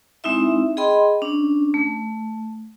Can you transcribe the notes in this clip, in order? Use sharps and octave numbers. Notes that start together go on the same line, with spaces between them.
G#3 C4 D#4 E4 E5
G#4 D#5 G5 B5 C6
C#4 D4
A3